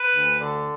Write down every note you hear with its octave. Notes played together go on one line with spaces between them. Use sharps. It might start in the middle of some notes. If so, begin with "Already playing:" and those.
Already playing: B4
D2
D3